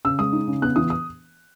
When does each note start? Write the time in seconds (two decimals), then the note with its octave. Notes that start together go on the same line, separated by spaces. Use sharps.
0.05 C#3 E6
0.19 G#3 D#6
0.33 D#4
0.47 C#3
0.62 B3 F#6
0.76 E3 D#6
0.90 D#6